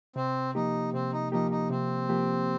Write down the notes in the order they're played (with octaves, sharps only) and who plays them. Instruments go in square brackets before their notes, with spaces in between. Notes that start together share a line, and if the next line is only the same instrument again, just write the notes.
[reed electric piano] C3 [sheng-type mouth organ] C4
[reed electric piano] F3 A#3 G4 [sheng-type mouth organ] D#4
[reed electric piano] C3 [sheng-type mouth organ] C4
[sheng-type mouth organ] D#4
[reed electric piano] F3 A#3 G4 [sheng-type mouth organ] D#4
[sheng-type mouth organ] D#4
[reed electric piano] C3 [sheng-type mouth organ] C4
[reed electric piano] F3 A#3 G4